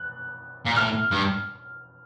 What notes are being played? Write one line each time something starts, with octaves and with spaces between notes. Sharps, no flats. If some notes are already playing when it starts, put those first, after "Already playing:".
Already playing: F#6
A#2
A2 F6
G2